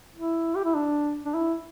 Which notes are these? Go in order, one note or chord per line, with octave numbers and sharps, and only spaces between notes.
E4
G4
E4
D4
D4
E4